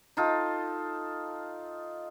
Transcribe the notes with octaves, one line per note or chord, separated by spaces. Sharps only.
D#4 F4 A4